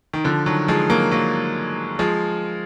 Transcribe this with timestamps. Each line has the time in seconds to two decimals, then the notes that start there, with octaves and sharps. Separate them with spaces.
0.13 D#3
0.24 D3 F3
0.46 D#3 F#3
0.68 F3 G#3
0.90 F#3 A#3
1.11 F#3 A#3
1.99 F3 G#3